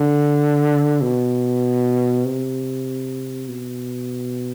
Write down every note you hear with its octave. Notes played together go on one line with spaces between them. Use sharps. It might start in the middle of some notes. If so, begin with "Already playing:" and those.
Already playing: D3
B2
C3
B2